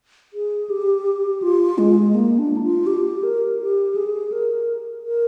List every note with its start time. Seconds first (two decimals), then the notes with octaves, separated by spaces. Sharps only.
0.33 G#4
0.70 G4
1.42 F4
1.78 G#3
2.14 A#3
2.39 D4
2.57 D#4
2.63 F4
2.87 G4
3.05 G4
3.23 A#4
3.59 G4
3.96 G#4
4.32 A#4
5.04 A#4